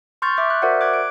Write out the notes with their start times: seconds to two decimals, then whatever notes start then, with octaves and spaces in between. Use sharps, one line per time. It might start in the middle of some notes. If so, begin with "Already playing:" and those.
0.22 C6 C#6 F6 G6 A6
0.37 E5 D6 G6
0.50 F#6
0.62 F#4 A#4 C5 D5 E5 F#5
0.81 D6 F#6 G#6
0.93 D7